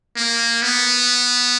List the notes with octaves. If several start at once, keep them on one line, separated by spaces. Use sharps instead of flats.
A#3
B3